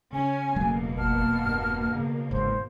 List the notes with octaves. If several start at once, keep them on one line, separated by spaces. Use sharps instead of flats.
C#3 C#4 G#5
E1 B2 F#3 A3 A#3
G1 F#5 A5 F6
G2
C#3
G1 G#2 C5